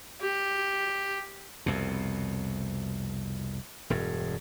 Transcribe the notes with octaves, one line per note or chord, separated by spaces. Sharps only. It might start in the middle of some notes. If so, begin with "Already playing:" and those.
G4
C2 F2 B2
E1 G2